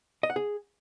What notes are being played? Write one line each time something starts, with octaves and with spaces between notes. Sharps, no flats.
D#5
F#5
G#4